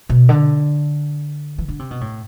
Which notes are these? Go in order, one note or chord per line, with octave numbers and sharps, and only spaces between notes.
B2
D3
E3
D3
C3
B2
A2